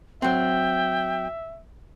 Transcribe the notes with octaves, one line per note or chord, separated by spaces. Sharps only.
F#3 C4 E5 G5